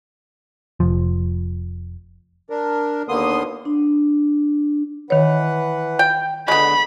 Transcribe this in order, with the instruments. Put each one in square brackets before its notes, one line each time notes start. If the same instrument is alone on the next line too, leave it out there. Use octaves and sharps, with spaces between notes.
[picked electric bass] F1 F3
[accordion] D4 A#4
D#2 D3 A#3 B3 C6 D#6
[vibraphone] D4
[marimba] D#3 C#5 [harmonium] E3 B4 F#5
[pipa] G5
[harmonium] D3 D#5 [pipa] G#3 B3 [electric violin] B5